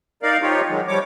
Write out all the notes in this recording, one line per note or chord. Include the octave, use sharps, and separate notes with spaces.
D#4 A#4 D5 F5
F3 D#4 F4 G4 C#5
D#3 F#3 G#3
F3 G3 C#5 D6